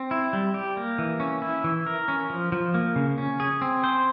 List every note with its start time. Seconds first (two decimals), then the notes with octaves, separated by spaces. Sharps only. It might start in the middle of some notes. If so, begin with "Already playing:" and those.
Already playing: C4
0.11 E4
0.33 G3
0.54 G4
0.77 A#3
0.98 E3
1.20 C#4
1.42 E4
1.64 E3
1.86 A#4
2.08 C#4
2.30 F3
2.52 F3
2.74 A#3
2.96 C#3
3.18 C#4
3.40 G#4
3.62 C4
3.84 C5